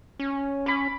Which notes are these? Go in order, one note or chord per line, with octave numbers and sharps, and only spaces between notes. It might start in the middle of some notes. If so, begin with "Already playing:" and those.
C#4
C#4 B5 D6